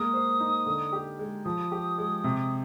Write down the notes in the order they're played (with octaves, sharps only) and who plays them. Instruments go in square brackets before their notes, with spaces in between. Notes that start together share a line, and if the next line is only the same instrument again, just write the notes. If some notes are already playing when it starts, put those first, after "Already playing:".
Already playing: [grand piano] G#3 A#3 [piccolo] D#6
[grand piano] C5
D#4
D3
G4
G#3
[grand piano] F3 [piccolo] D#6
[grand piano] G4
G#3
C3